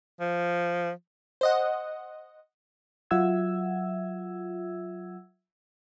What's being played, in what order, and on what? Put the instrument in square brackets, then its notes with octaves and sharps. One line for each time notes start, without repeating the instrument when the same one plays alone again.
[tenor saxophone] F3
[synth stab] C5 D#5 F#5
[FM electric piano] F#3 F4 E5 F#5 E6 G#6